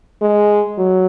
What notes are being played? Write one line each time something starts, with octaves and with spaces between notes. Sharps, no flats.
G#3
F#3